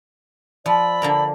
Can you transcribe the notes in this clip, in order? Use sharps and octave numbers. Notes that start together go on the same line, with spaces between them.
F3 D5 B5 E6
D3 A#3 A#4